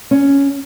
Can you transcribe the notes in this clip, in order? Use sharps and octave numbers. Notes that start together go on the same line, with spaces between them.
C#4